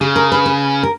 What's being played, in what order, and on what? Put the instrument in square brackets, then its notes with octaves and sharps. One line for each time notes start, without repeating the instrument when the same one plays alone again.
[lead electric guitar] C#3 [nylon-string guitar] G#4
[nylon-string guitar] A#4
B4
B4
A#4